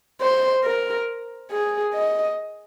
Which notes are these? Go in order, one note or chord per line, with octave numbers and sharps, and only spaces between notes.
C5
A#4
G#4
D#5